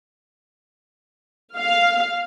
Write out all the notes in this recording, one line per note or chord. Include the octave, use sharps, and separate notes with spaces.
F5